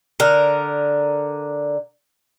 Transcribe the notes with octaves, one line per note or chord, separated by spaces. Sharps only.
D3 A#4